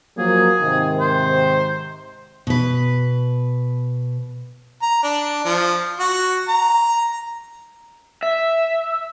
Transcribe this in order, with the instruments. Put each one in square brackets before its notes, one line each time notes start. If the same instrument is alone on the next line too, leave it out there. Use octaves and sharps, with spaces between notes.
[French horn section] F3 F#3 A#3 [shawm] G#4
[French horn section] G#2 C3 D#3
[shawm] C5
[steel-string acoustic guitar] B2 B4
[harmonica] A#5
D4
F3
F#4
A#5
[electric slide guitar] E5